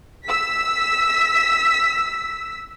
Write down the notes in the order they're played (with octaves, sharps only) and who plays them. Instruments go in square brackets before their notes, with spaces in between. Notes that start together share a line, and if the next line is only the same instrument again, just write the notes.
[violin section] E6 B6